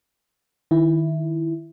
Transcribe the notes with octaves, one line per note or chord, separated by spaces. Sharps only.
D#3 E4